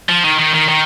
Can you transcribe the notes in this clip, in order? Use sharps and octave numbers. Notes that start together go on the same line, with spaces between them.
F3
D#3
D#3
D#3
D#3